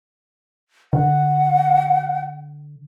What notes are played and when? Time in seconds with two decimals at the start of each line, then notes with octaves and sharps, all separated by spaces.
0.93 D3 F#5